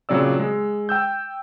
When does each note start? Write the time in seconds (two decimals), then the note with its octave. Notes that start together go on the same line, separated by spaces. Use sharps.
0.09 A#2 C#3 F#3 C4 D5 E6
0.39 G#3
0.89 G5 E6 G6